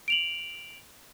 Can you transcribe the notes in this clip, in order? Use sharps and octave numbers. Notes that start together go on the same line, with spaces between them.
D7 F7 F#7